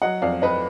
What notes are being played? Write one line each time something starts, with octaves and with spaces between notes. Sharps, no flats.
F#3 D#5 F#5
F2 D5 F5
F2 B4 D#5